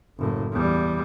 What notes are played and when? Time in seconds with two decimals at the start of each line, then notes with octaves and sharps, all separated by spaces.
0.18 F#1 A2
0.52 E2 G3